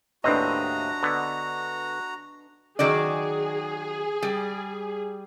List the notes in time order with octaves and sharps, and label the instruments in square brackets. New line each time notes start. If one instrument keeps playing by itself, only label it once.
[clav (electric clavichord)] D#2 A2 C4 [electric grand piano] D4 B4 D#5 [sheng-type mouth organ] F#4 A#5
[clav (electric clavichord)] D3 B3
[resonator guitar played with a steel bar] D#3 F#3 D5 [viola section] G#4
[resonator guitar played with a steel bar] G3